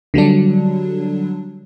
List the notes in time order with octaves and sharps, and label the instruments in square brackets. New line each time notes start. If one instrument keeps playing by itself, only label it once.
[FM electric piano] D3 F#3 G3 D4